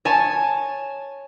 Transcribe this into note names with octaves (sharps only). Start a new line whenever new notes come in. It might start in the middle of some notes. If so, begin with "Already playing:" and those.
C#5 G#5 A5